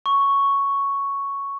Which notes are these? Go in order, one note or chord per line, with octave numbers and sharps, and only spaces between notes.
C#6